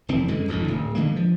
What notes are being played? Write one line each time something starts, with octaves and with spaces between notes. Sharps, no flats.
F1 E3 C4
F#2 D3 G#3
F1 C#2 A2 D#3
D1
D3 E3 G#3 A#3
F3